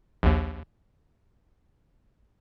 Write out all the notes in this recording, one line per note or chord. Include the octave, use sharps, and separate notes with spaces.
A#1 D#2